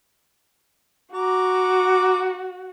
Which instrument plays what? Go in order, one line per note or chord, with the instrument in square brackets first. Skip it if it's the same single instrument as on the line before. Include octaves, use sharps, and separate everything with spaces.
[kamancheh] F#4 [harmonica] A#5 D6